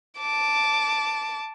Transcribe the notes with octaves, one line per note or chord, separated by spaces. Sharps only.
A5 D6